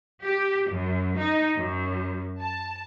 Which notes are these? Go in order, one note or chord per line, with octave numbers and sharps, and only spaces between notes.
G4
F#2
D#4
F#2
A5